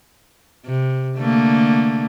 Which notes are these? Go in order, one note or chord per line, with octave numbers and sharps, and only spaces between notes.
C3
D3 A3 A#3